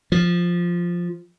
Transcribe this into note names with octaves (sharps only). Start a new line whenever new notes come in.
F3